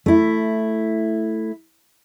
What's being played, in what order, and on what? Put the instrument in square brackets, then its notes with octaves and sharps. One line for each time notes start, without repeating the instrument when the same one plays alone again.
[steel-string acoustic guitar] A3 E4